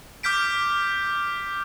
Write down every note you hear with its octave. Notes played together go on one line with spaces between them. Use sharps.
D6 F6 G6 B6 D7